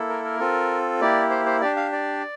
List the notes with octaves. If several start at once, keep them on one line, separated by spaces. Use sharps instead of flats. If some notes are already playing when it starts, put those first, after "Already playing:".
Already playing: A#3 E4 A4
A#4
A#4
C4 F4 A4
A#3 E4 G4 D5
C5
C5
D4 G4 D5
F5
D5